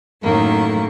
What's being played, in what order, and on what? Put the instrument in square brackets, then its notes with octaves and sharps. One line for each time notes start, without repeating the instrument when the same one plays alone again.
[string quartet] F#2 A2 D#3 A3 A#3 C#6